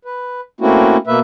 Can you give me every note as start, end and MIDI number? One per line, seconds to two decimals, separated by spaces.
0.05 0.41 71
0.61 0.97 57
0.61 0.97 58
0.61 0.97 60
0.61 0.97 61
0.61 0.97 64
0.61 0.97 66
1.07 1.20 47
1.07 1.20 58
1.07 1.20 71
1.07 1.20 76